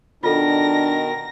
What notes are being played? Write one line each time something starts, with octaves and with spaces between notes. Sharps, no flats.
B2 D#3 D4 F4 A4 A#4 A#6